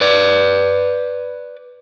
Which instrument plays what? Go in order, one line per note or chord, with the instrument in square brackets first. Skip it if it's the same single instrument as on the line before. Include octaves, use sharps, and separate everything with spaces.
[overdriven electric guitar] B4 D5